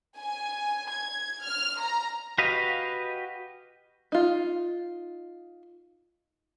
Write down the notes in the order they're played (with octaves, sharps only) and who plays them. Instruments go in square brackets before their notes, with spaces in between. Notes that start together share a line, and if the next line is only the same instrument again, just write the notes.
[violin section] G#5
G#6
F6
A#5
[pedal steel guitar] F#4 G4 B4 D#5 F5
[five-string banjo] D#4 F4